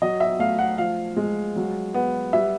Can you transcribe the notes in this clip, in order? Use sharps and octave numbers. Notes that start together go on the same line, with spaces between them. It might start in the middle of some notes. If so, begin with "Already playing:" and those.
F#3 D#5
E5
A3 F5
F#5
F3 F5
G#3
F#3
B3
G3 E5